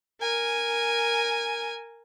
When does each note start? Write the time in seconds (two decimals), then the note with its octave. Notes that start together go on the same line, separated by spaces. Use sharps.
0.20 A#4 G#5